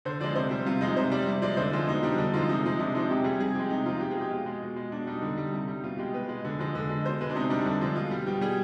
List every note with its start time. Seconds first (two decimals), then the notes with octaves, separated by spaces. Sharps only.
0.05 D3 C5
0.20 F3 G#3 D5
0.35 C3 C5
0.51 G3
0.66 C3 F4
0.81 F3 G#3 D#4
0.97 C3 C5
1.11 G3 D5
1.26 C3
1.42 F3 G#3 D5
1.57 D3 C5
1.73 F3 G#3 F4
1.87 B2 D#4
2.03 G3 D4
2.18 D3 D#4
2.33 F3 G#3 F4
2.49 C3 D#4
2.64 F3 G#3
2.79 C3 D4
2.94 F3 G#3 D#4
3.10 C3 G4
3.24 G3 G#4
3.39 C3 G#4
3.55 F3 G#3 G4
3.70 C3 D#4
3.86 F3 G#3 F4
4.01 B2 G4
4.11 G#4
4.17 G#3 G4
4.31 B2 F4
4.46 G#3
4.62 B2
4.76 G#3
4.92 B2 D4
5.07 G3 D#4
5.22 D3
5.37 G3
5.53 C3
5.68 G3
5.83 B2 F4
5.98 G#3 G4
6.14 B2 B4
6.29 G#3
6.45 D3
6.59 F3 G#3
6.75 D3
6.89 G#3
7.05 B2 C5
7.21 G#3 B4
7.30 D4
7.35 C3 D#4
7.50 G3 D4
7.66 D3
7.81 F3 G#3
7.96 B2 F4
8.11 G3
8.26 B2 G4
8.41 G3 G#4